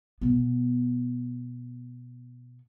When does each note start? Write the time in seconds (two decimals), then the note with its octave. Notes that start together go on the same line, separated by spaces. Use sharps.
0.21 B2 B3